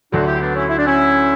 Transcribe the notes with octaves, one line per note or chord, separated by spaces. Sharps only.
D2 D3 F#3 D4 F#4
E4 G4
B3 D4
C#4 E4
E4
D4
C#4 E4